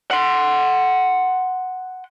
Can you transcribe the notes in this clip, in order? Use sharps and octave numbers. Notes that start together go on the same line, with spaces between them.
F#5 C6